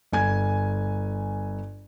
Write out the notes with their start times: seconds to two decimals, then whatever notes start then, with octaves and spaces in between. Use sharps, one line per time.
0.12 G1 G#5 G#6